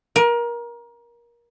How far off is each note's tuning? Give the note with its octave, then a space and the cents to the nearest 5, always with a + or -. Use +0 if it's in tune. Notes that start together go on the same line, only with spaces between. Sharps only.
A#4 +25